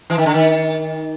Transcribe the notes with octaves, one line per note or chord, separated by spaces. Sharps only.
E3
D#3
D3
D#3